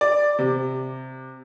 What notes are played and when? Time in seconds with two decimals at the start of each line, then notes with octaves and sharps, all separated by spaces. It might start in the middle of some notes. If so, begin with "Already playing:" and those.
0.01 D5
0.39 C3